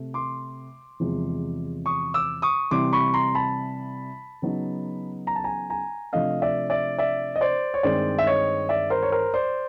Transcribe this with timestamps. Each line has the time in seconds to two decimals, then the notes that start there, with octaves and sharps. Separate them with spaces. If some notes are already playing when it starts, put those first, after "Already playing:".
Already playing: C3 A3
0.14 C6 D6
1.00 E2 C3 F3 G#3
1.86 C#6 D#6
2.14 D6 E6
2.42 C#6 D#6
2.71 C3 E3 G3 C6 D6
2.93 B5 C#6
3.14 A#5 C6
3.35 A5 B5
4.42 C#3 F#3 B3 D#4
5.27 A#5
5.36 A5
5.44 G#5 A#5
5.70 G#5 A#5
6.13 C3 F3 A3 D4 D#5 F5
6.42 D5 E5
6.70 D5 E5
6.98 D5 E5
7.36 D#5
7.41 C5 D5
7.74 C#5
7.83 G2 D#3 G#3 C4 C5 D5
8.18 E5
8.27 C#5 D#5
8.69 D5 E5
8.90 A#4 C5
9.03 C#5
9.12 A#4 C5
9.34 C5 D5